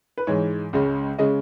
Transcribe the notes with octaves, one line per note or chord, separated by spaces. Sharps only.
B4
G#2 E3 G#3 C#5
C#2 C#3 G#3
C#3 G#3 D#5